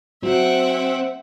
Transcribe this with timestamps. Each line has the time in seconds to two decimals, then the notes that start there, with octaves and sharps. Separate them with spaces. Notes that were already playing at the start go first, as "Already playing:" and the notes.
0.23 F#3 C4 E5 F#5 G5